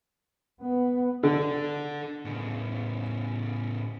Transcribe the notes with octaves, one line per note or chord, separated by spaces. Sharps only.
B3
D3 D4 A4
A2 C#3